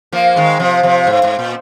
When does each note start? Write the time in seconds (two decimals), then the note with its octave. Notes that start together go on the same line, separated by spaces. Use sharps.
0.12 F3 A#3
0.36 D#3 G#3
0.59 C3 F3
0.83 C3 F3
1.07 G#2
1.23 G#2
1.39 A#2